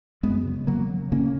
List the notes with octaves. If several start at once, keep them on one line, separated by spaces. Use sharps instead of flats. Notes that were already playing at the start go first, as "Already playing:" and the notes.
F#2 G#3 B3
C#3
C#3 F#3 A#3
C#3
C#3 A#3 C#4